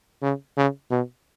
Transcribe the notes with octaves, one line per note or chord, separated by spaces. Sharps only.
C#3
C#3
B2